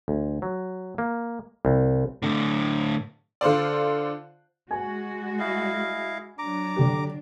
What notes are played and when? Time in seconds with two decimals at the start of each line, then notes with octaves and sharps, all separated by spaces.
0.08 D2
0.42 F#3
0.98 A#3
1.65 C2
2.22 A2 D3
3.41 D3 F4 C5 D5
4.71 G#3 F#4 G#5
5.39 E4 D#5 F5
6.38 F#3 D4 A#5 D6
6.76 D3 G4